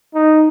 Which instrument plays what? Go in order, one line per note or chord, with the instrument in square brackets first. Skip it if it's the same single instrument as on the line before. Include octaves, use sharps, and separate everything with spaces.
[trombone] D#4